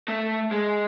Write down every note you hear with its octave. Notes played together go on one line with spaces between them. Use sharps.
A3
G#3